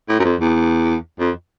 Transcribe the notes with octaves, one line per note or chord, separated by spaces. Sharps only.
A2
F#2
F2
E2
F2